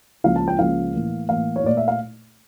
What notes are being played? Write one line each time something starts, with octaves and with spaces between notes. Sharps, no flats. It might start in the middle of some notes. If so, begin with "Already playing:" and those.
C#2 C#3 F3 A#3 F5
A5
G5
C#2 C#3 F3 A#3 F5
A2 E3 A#3
A2 E3 A#3 F5
C#5
A#2 A3 D5
E5
F5